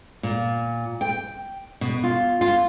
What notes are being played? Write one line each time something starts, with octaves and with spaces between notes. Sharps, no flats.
A#2
G5
B2
F4
F4